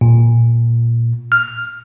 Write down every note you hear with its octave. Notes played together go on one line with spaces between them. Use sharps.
A#2
F6